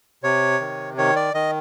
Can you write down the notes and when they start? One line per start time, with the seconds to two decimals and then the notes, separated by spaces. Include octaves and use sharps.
0.23 C3 C#5
0.60 D#3
0.98 D#3 C#5
1.16 D5
1.34 D#3 D#5